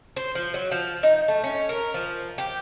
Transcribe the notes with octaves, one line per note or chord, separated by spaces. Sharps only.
C5
F3
F#3
F3
D#4
A3
C#4
A#4
F3
G4